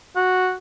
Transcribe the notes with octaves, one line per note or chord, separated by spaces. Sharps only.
F#4